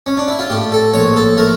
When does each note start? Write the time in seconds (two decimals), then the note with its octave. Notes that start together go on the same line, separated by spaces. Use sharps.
0.06 C#4
0.17 D4
0.28 E4
0.39 F4
0.50 A2 G4
0.72 A4
0.94 A#1 C#5
1.16 A4
1.37 A3 A#4